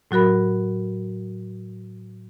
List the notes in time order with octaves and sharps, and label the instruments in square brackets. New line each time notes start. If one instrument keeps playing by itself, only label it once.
[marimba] A2 F#3 F#4 A#4 B5